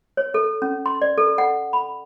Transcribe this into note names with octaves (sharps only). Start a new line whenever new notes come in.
C#5
A4
C#4
C6
D5
A4
F#5
B5